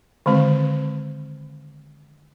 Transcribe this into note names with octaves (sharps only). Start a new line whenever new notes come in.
D3 D#3 G#3 C4